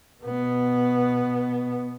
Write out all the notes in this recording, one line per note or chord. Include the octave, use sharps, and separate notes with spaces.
B2 B3